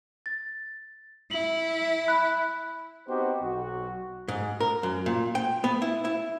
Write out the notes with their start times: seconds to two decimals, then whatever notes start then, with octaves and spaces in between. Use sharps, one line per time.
0.26 A6
1.31 E4 F#7
2.08 B5 F#6
3.08 B3 C4 D#4 F#4 G4 C5
3.41 B1 F#4
4.28 G#2
4.60 A#4
4.83 F#2
5.06 A#2
5.35 G5
5.64 B3
5.82 E4
6.05 E4